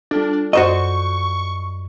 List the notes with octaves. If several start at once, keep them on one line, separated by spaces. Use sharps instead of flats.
G3 D4 F4 A4
F#2 F#4 C5 D5 D#5 C#6